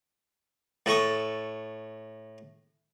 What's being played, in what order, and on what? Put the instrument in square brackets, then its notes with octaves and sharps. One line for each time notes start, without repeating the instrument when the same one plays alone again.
[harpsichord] A2 A4 C#6 D#6